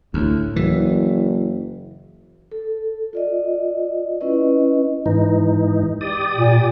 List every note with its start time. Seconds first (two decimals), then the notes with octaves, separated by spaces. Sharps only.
0.14 D2 A2
0.56 F#1 E3
2.52 A4
3.13 F4 D5 D#5
4.21 C#4 E4 B4 D#5
5.06 G#2 E3 D#4
6.01 G4 D5 D#6
6.37 A#2